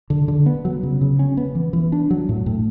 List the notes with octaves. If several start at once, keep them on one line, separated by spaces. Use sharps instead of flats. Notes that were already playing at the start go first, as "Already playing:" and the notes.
D3
D3
B3
F#3
C#3
C#3
C#4
B3
E3
E3
D4
F#3
A2
A2